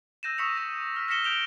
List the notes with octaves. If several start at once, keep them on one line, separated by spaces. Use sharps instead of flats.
E6 G6 A#6 D#7 E7
C#6 D#6 E6 B6 C#7 F7
A#6
F6 B6
F6 A#6 B6 C#7 E7 G7
G6 D7 F7 G7